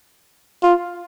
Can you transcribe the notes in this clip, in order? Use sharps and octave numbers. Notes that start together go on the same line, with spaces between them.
F4